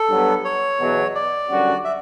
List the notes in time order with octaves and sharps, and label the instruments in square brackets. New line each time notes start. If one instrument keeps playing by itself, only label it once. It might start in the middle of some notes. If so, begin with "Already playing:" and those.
Already playing: [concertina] A4
[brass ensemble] G2 F#3 B3
[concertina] C#5
[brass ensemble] E2 B2 F#3
[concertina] D5
[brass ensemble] F#2 D3 G3 C#4 F#4
[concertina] E5